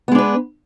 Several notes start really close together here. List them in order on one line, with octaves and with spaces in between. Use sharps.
B3 G#3 D4 B4